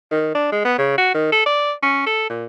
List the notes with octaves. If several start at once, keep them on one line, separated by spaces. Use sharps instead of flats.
D#3
D4
G#3
B3
C#3
F#4
D#3
A4
D5
C#4
A4
A#2